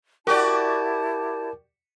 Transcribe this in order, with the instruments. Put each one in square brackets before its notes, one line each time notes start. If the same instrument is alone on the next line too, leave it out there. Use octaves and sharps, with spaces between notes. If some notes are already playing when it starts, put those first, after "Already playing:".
[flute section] E4 A5 [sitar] F#4 G4 D5 [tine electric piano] A#4 D6